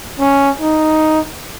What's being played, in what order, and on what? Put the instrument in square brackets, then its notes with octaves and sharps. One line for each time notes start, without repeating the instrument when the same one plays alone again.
[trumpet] C#4
D#4